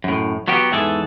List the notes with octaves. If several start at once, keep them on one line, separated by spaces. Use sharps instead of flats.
F#2 A2
F#3 B3 F#4 G4
E2 G#2 E3 G#4 A4